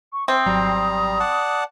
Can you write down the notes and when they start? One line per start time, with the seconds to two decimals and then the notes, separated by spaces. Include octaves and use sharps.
0.13 C#6
0.28 C4 E5 B5 D#6
0.46 G#1 F#3 G3 A#5 C7
1.20 D5 F#5 A5